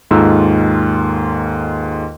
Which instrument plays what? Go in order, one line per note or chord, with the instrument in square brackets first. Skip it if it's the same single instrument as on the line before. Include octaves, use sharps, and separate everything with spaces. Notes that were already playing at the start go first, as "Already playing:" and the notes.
[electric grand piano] D#2 G#2 F4 A4 A#5 E6